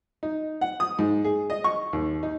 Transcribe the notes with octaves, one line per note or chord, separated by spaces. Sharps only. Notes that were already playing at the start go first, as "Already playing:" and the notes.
D#4
F#5
D#6
G#2
G#4
D#5
C#6
D#2
D#4